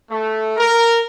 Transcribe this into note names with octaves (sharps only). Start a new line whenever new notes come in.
A3
A#4